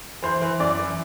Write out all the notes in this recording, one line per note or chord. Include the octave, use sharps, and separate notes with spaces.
E3 C5
E3
F#2 D5
E3